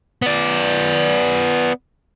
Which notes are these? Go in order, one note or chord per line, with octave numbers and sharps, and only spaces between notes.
B3 D5